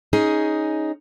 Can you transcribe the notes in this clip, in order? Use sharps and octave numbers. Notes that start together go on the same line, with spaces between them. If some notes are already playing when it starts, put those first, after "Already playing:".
C#4 D#4 G#4